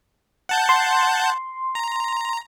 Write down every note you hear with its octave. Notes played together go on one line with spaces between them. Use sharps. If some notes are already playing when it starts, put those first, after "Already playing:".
F#5 A5 G6
C6
A#5